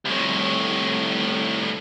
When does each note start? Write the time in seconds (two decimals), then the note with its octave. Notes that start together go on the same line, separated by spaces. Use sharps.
0.05 C2 A2